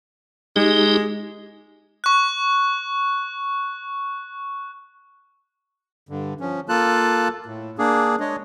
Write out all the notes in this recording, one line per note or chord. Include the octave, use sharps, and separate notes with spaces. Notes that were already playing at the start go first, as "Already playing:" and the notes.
G#3 D#4 G4
C#6 F#6
G2 D3
F3 C#4
A#3 F4 A4 A5 F#6
A2
A#3 D4 G#4
G#3 D4 C#5 D#5